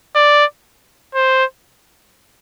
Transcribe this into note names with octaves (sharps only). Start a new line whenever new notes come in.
D5
C5